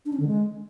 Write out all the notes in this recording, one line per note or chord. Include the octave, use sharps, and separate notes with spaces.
D4
C#4
D3
G#3